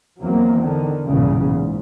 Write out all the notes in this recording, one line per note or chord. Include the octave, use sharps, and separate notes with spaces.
E2 F#3 A#3 C4
D3 D#3
B1 E2 G2 A#2 C#3
G#2